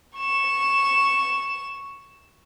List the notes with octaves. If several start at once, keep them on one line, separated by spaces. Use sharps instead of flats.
C#6 E7